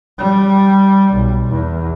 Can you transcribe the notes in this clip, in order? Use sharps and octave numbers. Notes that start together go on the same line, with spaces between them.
G3
B1
E2